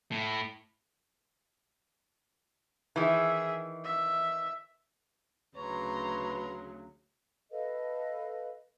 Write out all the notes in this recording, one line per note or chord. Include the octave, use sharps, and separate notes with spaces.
A2
D#3 E3 G#4 E5
E5
D2 C#3 F#3 B4 C#5 A#5 C6
A4 B4 D#5 F5